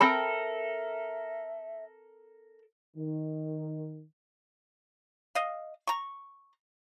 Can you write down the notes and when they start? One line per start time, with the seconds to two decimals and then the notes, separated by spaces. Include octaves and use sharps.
0.01 C4 A4 A#4 E5 G5 B5
2.97 D#3
5.35 D#5 F5
5.87 A#5 C#6